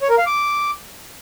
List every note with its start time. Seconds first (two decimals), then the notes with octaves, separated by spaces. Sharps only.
0.01 C#5
0.10 A#4
0.18 F5
0.26 D6